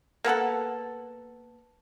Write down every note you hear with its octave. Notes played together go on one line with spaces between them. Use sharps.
A#3 B3 A4 F#5